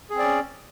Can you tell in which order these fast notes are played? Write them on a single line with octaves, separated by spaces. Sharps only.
G#4 C4 D5 C#4